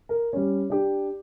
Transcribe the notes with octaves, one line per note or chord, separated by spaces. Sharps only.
A#4
G3 C#4
D4 G4